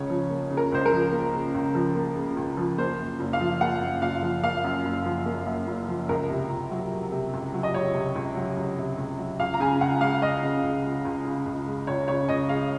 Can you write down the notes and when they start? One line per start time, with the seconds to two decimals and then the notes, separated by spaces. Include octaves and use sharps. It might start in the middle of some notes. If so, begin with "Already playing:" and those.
Already playing: C#2 C#3 C#5
0.10 F3
0.30 A#3
0.51 C#3
0.57 A#4
0.72 C#2 C5
0.86 A#4
0.92 F3
1.12 A#3
1.34 C#3
1.54 C#2
1.75 F3
1.95 A#3
2.16 C#3
2.36 C#2
2.57 F3
2.78 A#3 C5
2.99 F#2
3.20 F#1
3.33 F5
3.40 F3
3.61 A#3 F#5
3.81 F#2
4.02 F#1 F5
4.23 F3
4.43 A#3 F5
4.64 F#2
4.85 F#1
5.06 F3
5.26 A#3
5.46 F#2
5.67 F#1
5.88 F3
6.09 C#2 A#4
6.30 C3
6.50 C#2
6.71 F#3
6.92 C#2
7.12 C3
7.33 C#2
7.54 F#3
7.63 D#5
7.74 C#2 C#5
7.94 C3
8.15 C#2
8.36 F#3
8.57 C#2
8.78 C3
8.98 C#2
9.19 F#3
9.39 C#2 F5
9.54 A#5
9.60 C#3 G#5
9.80 C#2 F#5
10.01 G#3 F5
10.22 C#2 D#5
10.42 C#3
10.63 C#2
10.84 G#3
11.05 C#2
11.25 C#3
11.46 C#2
11.67 G#3
11.87 C#2 C#5
12.08 C#3 C#5
12.29 C#2 D#5
12.49 G#3 F5